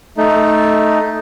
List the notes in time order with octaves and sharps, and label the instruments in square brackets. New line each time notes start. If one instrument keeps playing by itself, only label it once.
[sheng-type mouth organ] A3 D#4